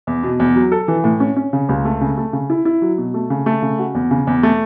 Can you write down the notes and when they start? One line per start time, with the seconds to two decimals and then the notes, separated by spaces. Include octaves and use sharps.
0.07 E2
0.23 B2
0.39 E2
0.56 F#3
0.72 A4
0.88 E3
1.04 A2
1.20 C#4
1.37 C#4
1.53 C#3
1.69 C#2
1.85 A3
2.01 C#3
2.17 A3
2.33 C#3
2.50 E4
2.65 E4
2.82 F#3
2.98 B2
3.14 A3
3.30 C#3
3.46 A3
3.62 C#3
3.79 F#4
3.95 E2
4.11 C#3
4.27 E2
4.43 A3